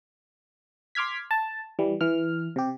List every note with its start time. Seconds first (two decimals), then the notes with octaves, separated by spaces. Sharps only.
0.95 C6 D6 F6 G#6 B6
1.31 A5
1.79 E3 G3
2.01 E3 F6
2.56 C3 G4